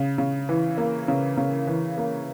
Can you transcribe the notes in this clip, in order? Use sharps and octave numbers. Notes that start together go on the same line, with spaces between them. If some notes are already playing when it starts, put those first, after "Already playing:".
Already playing: C#3
C#3
E3
A#3
C#3
C#3
E3
A#3